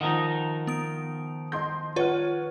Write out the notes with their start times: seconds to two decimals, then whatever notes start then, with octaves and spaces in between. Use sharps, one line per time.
0.01 D#3 F3 D#4 F#5 A#5
0.67 B3 D#6 D7
1.52 D#5 C6 G6
1.96 F4 B4 C#5 F#5 F6